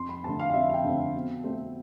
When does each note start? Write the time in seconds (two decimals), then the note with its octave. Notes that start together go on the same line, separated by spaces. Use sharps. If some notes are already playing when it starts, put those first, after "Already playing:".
Already playing: F2 C6
0.09 B5
0.24 D3 A3 C4 A5
0.40 F5
0.50 F5
0.54 F2 E5
0.70 F5
0.74 G5
0.84 D3 A3 C4
1.14 B2
1.44 A3 C4